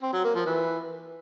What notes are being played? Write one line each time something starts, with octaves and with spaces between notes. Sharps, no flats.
C4
F#3
A#3
F3
E3